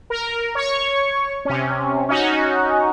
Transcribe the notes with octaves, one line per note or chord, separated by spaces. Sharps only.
A#4
C#5 C#6
C3 C#4
C#4 D#4 F#4